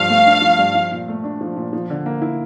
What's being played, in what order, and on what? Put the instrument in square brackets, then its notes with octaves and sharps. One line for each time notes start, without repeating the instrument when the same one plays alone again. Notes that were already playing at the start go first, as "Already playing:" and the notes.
Already playing: [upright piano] G2 F3 [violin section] F5
[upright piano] A3
D4
F3
G2
F3
A#2
A3
D4
F3
A#2
F3
D3
A#3
E4